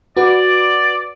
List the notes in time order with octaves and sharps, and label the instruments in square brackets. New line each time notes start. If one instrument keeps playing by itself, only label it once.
[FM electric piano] F#4 B4 [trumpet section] D5